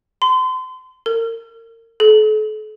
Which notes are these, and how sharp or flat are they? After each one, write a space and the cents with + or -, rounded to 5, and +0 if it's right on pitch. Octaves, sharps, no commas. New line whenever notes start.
C6 -35
A#4 -30
A4 -40